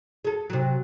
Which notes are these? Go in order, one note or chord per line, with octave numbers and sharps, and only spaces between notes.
G#4 A4
C3 F#3